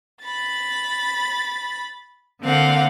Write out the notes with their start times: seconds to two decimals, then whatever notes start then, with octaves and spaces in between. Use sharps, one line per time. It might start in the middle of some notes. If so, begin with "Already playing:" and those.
0.22 B5 A6
2.43 D3 A#3 C4 F5 F#5